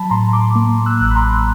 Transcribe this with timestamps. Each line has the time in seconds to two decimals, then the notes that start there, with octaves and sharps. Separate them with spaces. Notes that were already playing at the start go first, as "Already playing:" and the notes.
Already playing: F#3 A5 B5
0.10 A2 A#5 C6
0.33 C6 D6
0.55 A#3
0.86 E6 F#6
1.01 A1
1.11 B5
1.15 A#5 C6